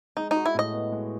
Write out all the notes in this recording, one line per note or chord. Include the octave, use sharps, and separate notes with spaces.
G#3 D#4
D#4
F#4
E4
A2 D#5
B3
G#3